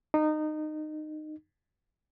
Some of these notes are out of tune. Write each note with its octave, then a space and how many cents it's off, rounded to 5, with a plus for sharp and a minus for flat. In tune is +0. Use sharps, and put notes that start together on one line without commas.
D#4 -20